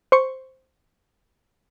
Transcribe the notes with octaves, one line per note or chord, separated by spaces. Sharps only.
C5 C#6